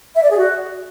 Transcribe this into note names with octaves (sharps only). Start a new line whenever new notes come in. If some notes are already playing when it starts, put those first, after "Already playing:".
E5
D5
G#4
F#4